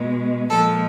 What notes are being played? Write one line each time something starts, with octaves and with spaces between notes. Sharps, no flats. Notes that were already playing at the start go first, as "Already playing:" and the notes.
Already playing: B2 G#3
A#2 F3 G#3 A4